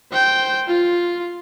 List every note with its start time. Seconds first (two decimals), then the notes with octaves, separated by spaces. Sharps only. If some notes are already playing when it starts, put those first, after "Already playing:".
0.12 C5 G5
0.68 F4